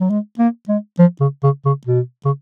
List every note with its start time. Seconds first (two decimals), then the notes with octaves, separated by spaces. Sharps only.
0.01 F#3
0.10 G#3
0.39 A#3
0.69 G#3
0.99 F3
1.21 C#3
1.43 C#3
1.66 C#3
1.87 B2
2.25 C#3